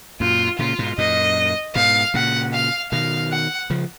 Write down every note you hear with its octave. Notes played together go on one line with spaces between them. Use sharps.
F#2 A#2 F4
A#2 C#3 F4
G#2 B2
F#2 A#2 D#5
G#2 B2 F5
A#2 C#3 F#5
F5
B2 D#3 F5
F#5
C#3 F3